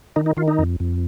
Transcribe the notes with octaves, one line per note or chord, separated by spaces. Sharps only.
D#3 D#4
D#4
D#3 F4
D#4
F2
F2